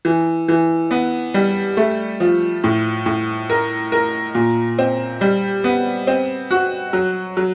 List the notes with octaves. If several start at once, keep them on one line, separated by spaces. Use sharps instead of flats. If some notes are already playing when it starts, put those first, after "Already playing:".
E3
E3
B3
G3
A3
F3
A2
A2
A#4
A#4
A#2
C4
G3
B3
C4
F#4
F#3
F#3